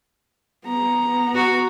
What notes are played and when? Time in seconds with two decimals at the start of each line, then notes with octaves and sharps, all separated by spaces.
0.65 B3 A#5
1.35 F#4